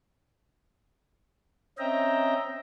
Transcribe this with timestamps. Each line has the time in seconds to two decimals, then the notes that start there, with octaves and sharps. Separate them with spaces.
1.78 C4 C#4 D#5 E5 G5 A#5